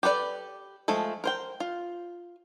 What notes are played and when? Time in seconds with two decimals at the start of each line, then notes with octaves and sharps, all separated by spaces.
0.03 G4 A4 B4 D5
0.88 F3 G#3 A3 A4
1.24 A#4 C5 G5
1.60 F4